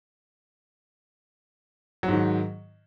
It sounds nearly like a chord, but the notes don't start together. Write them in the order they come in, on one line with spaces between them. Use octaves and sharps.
F#3 G#2 D#3